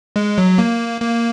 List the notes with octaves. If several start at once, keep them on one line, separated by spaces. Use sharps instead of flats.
G#3
F#3
A#3
A#3